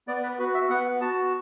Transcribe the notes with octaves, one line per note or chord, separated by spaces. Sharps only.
B3 D5
B4
F#4 B4
E5
B3 F#5
F#4 A5